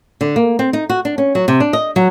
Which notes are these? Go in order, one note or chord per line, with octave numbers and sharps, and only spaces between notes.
D3
A#3
C4
D#4
F#4
D4
C#4
F#3
C3
D4
D#5
F#3